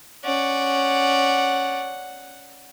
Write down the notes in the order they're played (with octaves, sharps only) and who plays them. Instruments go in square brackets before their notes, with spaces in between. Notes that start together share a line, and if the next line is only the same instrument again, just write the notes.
[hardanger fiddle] C#4 D5 [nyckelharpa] F#5